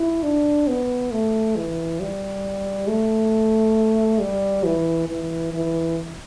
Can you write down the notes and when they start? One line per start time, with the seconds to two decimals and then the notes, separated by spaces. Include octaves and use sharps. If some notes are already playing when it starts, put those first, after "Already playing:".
Already playing: E4
0.23 D4
0.67 B3
1.11 A3
1.56 E3
2.00 G3
2.88 A3
4.20 G3
4.64 E3
5.08 E3
5.53 E3